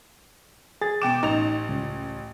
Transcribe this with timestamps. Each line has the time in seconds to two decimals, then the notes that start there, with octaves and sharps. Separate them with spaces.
0.82 G#4 A6
1.02 B2 G5 D6 E7
1.23 A1 D#4 F7
1.69 C#2